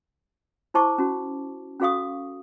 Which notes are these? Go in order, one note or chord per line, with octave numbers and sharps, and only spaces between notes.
E4 C5 A5 C#6 D6
C#4 F#4
C#4 F#4 A4 F5 C#6 D#6